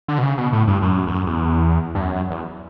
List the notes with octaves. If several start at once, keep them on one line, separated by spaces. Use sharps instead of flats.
D3
B2
C#3
B2
A2
G2
F#2
E2
F#2
E2
G2
F#2
E2